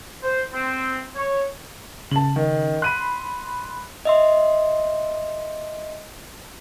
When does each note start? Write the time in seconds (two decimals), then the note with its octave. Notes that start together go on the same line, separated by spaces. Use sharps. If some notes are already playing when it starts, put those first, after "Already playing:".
0.23 C5
0.53 C4
1.15 C#5
2.11 C#3 A5 F#7
2.36 D#3
2.82 B5 C6 F#6 D#7
4.05 D#5 E5 C6